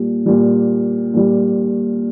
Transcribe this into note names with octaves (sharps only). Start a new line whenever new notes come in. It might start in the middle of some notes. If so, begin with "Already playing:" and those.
Already playing: A#2 G3
A#2 G3
A#2 G3